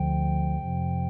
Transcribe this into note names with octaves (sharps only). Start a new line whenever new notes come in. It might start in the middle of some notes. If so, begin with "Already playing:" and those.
Already playing: D2 D3 F3 G5
F2 C3 F3